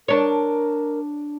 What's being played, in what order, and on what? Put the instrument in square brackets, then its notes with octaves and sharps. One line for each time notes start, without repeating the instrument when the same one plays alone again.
[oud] D4 C#5 [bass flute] A#4